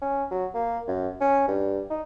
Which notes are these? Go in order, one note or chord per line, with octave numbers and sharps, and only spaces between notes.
C#4
F#3
A#3
F#2
C#4
G2
D#4